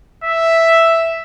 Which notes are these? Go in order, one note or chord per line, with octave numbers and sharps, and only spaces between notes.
E5